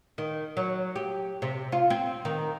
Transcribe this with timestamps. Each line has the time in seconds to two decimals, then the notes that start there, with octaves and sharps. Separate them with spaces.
0.18 D#3
0.57 F#3
0.96 G4
1.42 C3
1.72 F4
1.90 C4
2.25 D#3